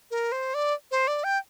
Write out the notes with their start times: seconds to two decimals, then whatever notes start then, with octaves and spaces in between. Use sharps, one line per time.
0.11 A#4
0.32 C5
0.54 D5
0.91 C5
1.07 D5
1.24 G5